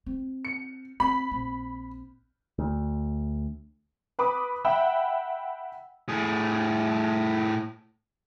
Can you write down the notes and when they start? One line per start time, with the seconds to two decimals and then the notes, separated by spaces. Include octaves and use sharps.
0.06 C4
0.45 C#7
1.00 C4 B5
1.31 A#1 C4
2.59 D2
4.19 B4 B5 D6 D#6
4.65 E5 F#5 G5 B5 E6
6.08 A2 G#4